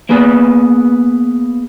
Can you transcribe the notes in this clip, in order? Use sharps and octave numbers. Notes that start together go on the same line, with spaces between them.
A#3 B3 G#4 B4